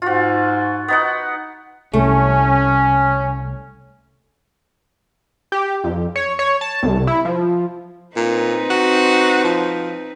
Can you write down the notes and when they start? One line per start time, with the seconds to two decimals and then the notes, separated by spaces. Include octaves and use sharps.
0.02 G#2 F4 F#4
0.88 B3 D#4 F#5
1.93 C2 A3 C#4
5.52 G4
5.84 F2
6.16 C#5
6.39 C#5
6.61 A5
6.83 C2
7.07 E4
7.25 F3
8.16 A#2 C4 D#4 B4
8.70 F#4
9.44 F3